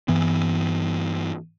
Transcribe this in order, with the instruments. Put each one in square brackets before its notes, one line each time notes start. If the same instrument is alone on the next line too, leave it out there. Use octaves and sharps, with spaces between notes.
[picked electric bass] G2 E3 B3